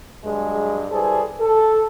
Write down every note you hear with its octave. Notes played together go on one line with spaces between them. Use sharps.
G2 F#3 G#3 G#4
G3 E4 G#4 A4 B4 C5
A4